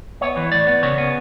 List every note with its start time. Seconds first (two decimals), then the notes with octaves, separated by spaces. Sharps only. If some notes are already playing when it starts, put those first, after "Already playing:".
0.21 B3 C#5
0.37 E3
0.52 A2 D5
0.67 B3
0.83 C#3 C#5
0.98 B3